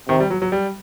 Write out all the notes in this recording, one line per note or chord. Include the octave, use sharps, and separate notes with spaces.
C3 D#3
G3
F#3
F#3
G3